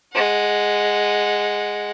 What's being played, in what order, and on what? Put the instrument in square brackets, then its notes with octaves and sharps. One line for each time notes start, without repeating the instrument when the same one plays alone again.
[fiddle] G#3 F#5